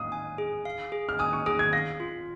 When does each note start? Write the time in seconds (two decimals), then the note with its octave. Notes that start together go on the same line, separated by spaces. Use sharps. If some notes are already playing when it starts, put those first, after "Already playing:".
Already playing: F5 D#6 F6
0.12 G#5
0.38 G#4
0.65 F5
0.92 G#4
1.09 F6
1.19 G#5 D#6
1.33 C#6
1.46 G#4 D#6
1.59 G#6
1.73 F5 A#6
2.00 F4